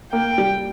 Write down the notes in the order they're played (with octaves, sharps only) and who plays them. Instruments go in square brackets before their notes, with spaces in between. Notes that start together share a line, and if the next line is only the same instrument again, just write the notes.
[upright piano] A#3 [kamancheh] G5
[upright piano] G3